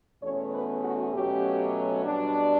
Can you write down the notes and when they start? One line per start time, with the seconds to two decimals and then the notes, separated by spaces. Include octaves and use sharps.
0.22 E2 B2 A3 C#4 C#5
0.52 B4
0.83 F#4
1.13 B2 F#3 A3 C#4 G4
2.04 B2 G3 D4